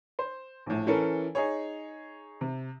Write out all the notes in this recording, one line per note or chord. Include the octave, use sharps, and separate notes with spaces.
C5
A#1 A2
E3 C#4 A4 A#4
D#4 G#4 C#5
C3